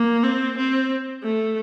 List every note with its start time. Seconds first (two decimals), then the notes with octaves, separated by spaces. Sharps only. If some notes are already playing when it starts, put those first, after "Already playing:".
Already playing: A#3
0.24 C4
0.57 C4
1.23 A3